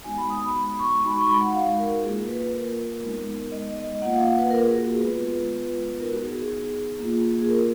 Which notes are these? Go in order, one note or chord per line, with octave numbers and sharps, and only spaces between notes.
G#3 B3 D#4 F#4 G#5
B5
D#6
B5
B5
C#6
G#3 D#4 F#4 B5
C#6
B5
F#5
F5
A#4
A#3 F4 G#4
B4
B4
A#4
G#3 B3 D#4
D#5
D#5
A#3 F4 F#5
F5
F#5
B4
A#4
G#4
F#4
G#4
G#3 B3 F4 B4
B3 D#4 F#4 A#4
F#4
G#4
G#4
A#3 F4
G#4
A#4